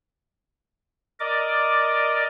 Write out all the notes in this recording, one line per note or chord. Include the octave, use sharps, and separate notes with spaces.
A#4 D5 D#5 D6